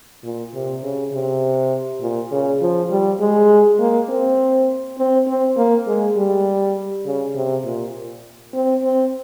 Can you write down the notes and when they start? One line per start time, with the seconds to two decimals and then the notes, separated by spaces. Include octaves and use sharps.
0.24 A#2
0.54 C3
0.83 C#3
1.13 C3
2.02 A#2
2.32 C#3
2.61 F3
2.91 G3
3.21 G#3
3.80 A#3
4.09 C4
4.98 C4
5.28 C4
5.57 A#3
5.87 G#3
6.17 G3
7.06 C#3
7.35 C3
7.65 A#2
8.54 C4
8.83 C4